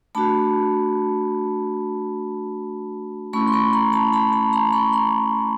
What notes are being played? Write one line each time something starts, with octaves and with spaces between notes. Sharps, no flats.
A3 D4 F#4 A5 B5
A3 C#4 E4 B5 C#6
C6
B5 C#6
A#5 C6
A5 B5
A5 B5
A5 B5
A#5 C6
B5 C#6
A#5 C6